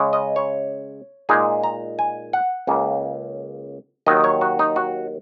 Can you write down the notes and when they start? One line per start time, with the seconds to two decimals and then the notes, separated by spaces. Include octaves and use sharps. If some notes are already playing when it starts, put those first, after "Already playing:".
Already playing: C#3 G#3 C#4
0.13 D#5
0.36 C#5
1.29 A#2 G#3 D#4 G#4
1.64 A#5
1.99 G#5
2.33 F#5
2.67 C#2 C#3 A#3
4.06 D#2 D#3 F#3 D#4 D#5
4.24 C#5
4.41 F#4
4.59 D#4
4.76 F#4